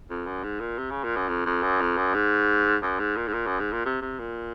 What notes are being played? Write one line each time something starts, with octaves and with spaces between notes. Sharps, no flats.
F2
F#2
G#2
A#2
C3
C#3
A#2
F#2
F2
F2
F#2
F2
F#2
G#2
F#2
G#2
A#2
G#2
A#2
F#2
G#2
A#2
C3
C3
A#2